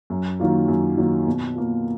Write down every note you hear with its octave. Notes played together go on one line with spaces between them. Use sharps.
F#2
D#3 F#3 A#3 F4
F#2
D#3 F#3 A#3 F4
B2
A#3 F4